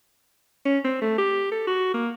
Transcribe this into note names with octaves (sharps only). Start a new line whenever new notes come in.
C#4
C4
A3
G4
A4
F#4
A#3